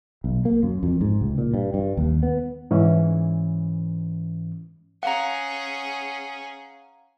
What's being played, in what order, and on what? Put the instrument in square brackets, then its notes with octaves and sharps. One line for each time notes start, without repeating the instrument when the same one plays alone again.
[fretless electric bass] B1
A#3
F#2
F2
G#2
C#2
A#2
G2
G2
D#2
B3
[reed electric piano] G#2 E3 C#4
[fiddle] C#4 G#4 [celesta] F5 [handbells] F#5 A#5